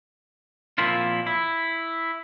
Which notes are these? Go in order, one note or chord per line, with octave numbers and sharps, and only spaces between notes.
A#2 F3 A#3 C4 E4 F4
E4